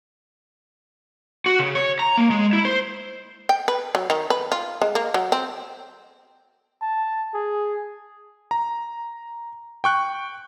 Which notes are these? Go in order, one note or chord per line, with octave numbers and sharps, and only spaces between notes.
F#4
C#3
C#5
A#5
A#3
G#3
E4
C5
G5
B4
F#3
D#3
B4
F4
G#3
A#3
F#3
C4
A5
G#4
A#5
G5 C#6 F#6